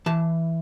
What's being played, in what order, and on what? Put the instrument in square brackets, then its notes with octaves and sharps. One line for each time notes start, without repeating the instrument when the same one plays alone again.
[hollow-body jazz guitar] E3 A5